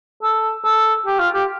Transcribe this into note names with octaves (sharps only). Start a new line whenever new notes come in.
A4
A4
G4
F4
G4